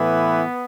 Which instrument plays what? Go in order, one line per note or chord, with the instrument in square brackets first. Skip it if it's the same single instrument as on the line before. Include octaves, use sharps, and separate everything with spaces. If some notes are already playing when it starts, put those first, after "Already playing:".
Already playing: [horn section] A2 E3 B3